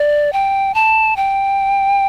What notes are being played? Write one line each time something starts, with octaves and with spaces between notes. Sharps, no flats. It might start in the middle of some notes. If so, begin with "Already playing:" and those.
Already playing: D5
G5
A5
G5